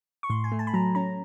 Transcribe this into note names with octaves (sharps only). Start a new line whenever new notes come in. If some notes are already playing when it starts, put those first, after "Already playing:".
C#6
A2 C6
G#5
A3
A5
B5
F#3 A#5
C#4 A#5